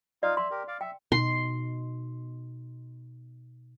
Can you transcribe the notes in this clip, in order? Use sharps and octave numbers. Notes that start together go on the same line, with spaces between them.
D#4 F4 D5 F5
E5 C6
G4 A#4
D5 F5
E5 G5
B2 D#4 C6